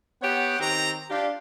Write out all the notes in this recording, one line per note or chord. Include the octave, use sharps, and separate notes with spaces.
B3 G4 C#5 F#5
D#3 C4 G4 A#5
D4 F4 G4